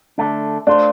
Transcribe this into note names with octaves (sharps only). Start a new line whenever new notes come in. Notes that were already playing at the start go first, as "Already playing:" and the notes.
D3 A3 D4
A3 D4 F4 C5